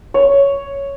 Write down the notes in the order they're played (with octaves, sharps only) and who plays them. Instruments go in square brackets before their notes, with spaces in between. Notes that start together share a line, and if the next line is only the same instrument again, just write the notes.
[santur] C#5